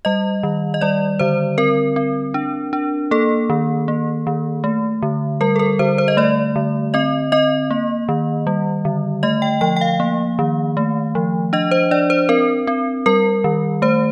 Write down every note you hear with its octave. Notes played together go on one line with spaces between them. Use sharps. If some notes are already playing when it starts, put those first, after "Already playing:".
G3 D#5
D#3
D#5
G3 D5
D3 C5
C4 A#4
C4
D4
D4
A#3 A4
D#3
A#3
D#3
A3
D3
G3 A#4
A4
A#4
D3 C5
C5
D#5
A3 D5
D3
C4 D#5
C4 D#5
A#3
D#3
G3
D3
A3 D#5
G5
F3 G5
G5
F5
A#3
D#3
A3
F3
D4 D#5
C5
D4 D5
C5
C4 A#4
C4
G3 A#4
D#3
A3 C5